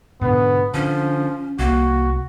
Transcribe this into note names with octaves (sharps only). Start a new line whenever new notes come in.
G#2 B2 D3 B3
D3 F3 C#4
C2 A#3 F#4